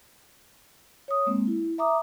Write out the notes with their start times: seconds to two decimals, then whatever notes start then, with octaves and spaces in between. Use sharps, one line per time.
1.08 C#5 D#6
1.26 G#3 A#3 C4
1.47 E4
1.78 E5 A#5 D6 D#6